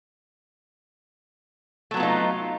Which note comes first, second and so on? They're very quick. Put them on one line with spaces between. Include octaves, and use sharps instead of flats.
A3 F#3 B3 F4 D#4